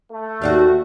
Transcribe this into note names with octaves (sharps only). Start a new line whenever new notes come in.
A3
D#2 F#4 D5 F5